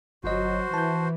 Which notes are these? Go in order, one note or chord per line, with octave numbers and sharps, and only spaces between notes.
G1 F#3 F#4 C5 D#5
E3 A5 G6